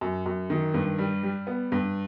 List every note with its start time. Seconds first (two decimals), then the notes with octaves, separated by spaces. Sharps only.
0.01 F#2
0.26 F#2
0.50 D#3
0.74 G2
0.98 G3
1.23 G3
1.47 B3
1.72 G2